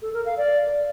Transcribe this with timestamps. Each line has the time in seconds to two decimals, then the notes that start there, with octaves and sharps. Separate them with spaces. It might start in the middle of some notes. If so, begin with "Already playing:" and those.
0.02 A4
0.14 A#4
0.26 F5
0.37 D5